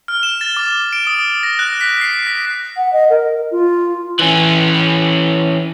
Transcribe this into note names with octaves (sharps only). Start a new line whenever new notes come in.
F6
E7
A6
D6
D7
D#6
A#6
F#6
B6
C7
B6
F#5
D#5
A#4
F4
E3 C#4